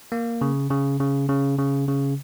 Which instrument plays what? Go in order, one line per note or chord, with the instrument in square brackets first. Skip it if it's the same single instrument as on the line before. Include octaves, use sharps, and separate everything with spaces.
[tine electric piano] A#3
C#3
C#3
C#3
C#3
C#3
C#3